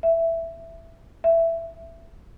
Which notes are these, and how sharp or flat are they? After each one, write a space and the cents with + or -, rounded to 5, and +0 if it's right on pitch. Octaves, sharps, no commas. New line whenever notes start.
E5 +5
E5 +10